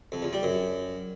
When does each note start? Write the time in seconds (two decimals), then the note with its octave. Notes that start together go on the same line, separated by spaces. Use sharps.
0.12 F2
0.22 E2
0.33 G3
0.43 F#2